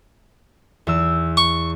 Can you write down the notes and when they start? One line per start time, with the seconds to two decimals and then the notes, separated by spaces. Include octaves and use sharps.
0.87 E2 E6
1.37 C#6